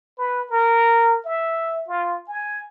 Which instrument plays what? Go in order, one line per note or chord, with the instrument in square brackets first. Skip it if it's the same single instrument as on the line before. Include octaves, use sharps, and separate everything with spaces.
[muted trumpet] B4
A#4
E5
F4
G#5